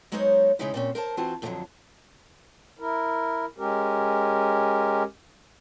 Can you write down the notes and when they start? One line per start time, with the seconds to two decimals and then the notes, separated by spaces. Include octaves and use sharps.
0.12 F#3 G#3 B3 D#4 C5 C#5
0.59 C#3 E3 G#3 C#4 D#4 E4
0.74 A#2 C4 C#4
0.95 A#4 C5 F5 A5
1.17 E3 C4 F4 F#4 C5 A5
1.42 F2 A#2 D3 D#3 F3 F#3
2.79 E4 A#4
3.58 G#3 C#4 G4 A#4